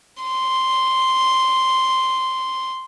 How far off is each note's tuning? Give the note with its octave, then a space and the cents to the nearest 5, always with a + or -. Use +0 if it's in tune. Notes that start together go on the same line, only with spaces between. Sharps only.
C6 -5